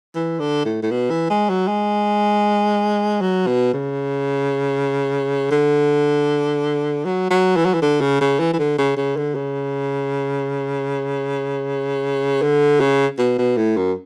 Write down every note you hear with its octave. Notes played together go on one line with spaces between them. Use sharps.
E3
D3
A2
A2
B2
E3
G#3
F#3
G#3
F#3
B2
C#3
D3
F#3
F#3
E3
F#3
E3
D3
C#3
C#3
E3
E3
D3
C#3
C#3
D3
C#3
D3
C#3
B2
B2
A2
F#2